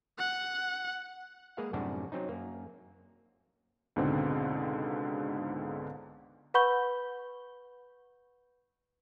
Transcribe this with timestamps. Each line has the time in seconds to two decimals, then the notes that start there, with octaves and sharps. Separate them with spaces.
0.19 F#5
1.57 G#3 A#3 G#4 B4 F5 F#5
1.73 F#2 A2 C3 G3 D4 F#4
2.12 F#3 C4 C#4 D#4
2.29 F#2 A#3
3.96 C#2 G#2 B2 D3 C4
6.54 B4 F#5 B5 C#6 G6 G7